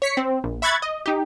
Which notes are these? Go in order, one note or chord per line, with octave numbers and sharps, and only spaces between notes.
C#5 B6 C#7
C4
A#1
E5 B5 C#6 F#6 G#6 A6
D#5
D#4 G4